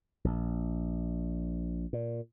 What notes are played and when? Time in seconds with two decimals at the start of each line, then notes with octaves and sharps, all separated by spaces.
0.24 A#1
1.93 A#2